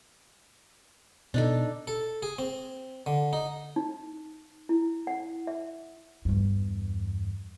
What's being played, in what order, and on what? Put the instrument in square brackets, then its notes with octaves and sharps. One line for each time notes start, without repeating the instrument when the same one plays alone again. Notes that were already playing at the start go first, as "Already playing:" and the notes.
[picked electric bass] B2 [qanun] D4 D#4 A4
[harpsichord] A4
G#4
C4
D3
D#4
[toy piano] D#4
E4
F#5
E5
[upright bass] E2 G2